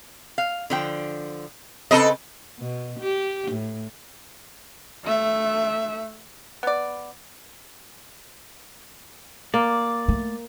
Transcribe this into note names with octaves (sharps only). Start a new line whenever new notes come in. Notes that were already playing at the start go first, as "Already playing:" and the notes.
F5
D3 F3 G5
C#3 C4 A4 B4 D#5
B2
G4
A2
A3 E5
B3 D5
A#3 D5
A3